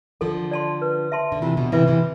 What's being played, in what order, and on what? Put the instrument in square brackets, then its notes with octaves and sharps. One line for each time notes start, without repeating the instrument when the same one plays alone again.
[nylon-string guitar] D3 F3 [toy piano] A4
[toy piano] D5 A5 C6
B4
E5 A5 C6
[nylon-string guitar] D3
[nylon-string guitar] C3 E3 [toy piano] F4
[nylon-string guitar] B2 D3
[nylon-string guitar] C3 E3 [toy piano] B4 E5
[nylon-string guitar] C3 E3